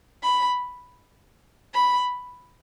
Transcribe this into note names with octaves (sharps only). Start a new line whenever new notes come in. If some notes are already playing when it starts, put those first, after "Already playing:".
B5
B5